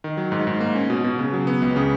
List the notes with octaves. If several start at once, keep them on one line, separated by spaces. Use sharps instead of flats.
D#3
F#3
G#2
G#2
A#3
C#4
B2
B2
C#3
F#3
B3
C#2
C#3